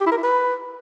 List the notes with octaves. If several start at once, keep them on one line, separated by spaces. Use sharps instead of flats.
G4
E4
A#4
E4
B4